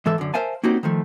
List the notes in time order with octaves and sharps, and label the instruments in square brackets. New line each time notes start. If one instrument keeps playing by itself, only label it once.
[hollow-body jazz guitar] G#2 E3 A4 E5
F#2 D3
A#4 C5 E5 F5 G#5 A5
A#3 C4 C#4 D#4 F#4 G4
D#3 F3 A3